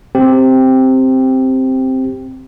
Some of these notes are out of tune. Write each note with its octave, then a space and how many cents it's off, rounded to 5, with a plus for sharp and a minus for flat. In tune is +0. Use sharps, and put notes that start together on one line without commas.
C4 +0 G4 +0